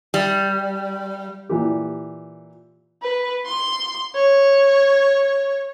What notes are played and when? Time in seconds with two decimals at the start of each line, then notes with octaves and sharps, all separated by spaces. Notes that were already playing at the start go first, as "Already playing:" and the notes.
0.14 G3
1.49 A#2 E3 G4
3.02 B4
3.46 C6
4.15 C#5